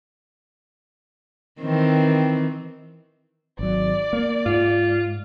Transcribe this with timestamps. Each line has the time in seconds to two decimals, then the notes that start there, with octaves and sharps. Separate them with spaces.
1.61 D#3 E3 C4
3.59 G#1 F#3 D5
4.13 A#3
4.46 G#2 F4